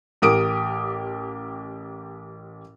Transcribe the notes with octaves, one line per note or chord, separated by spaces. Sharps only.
A1 G4 A#4 D#6 D7